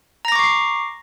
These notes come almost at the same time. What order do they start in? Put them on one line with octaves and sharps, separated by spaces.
A#5 A#6 D6 C#6 C7